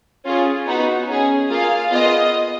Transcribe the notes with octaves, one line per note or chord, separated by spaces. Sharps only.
C#4 F4 G#4
B3 D#4 F#4
C#4 G#4
A#3 F4 G#4 F5
B3 F4 G#4 D#5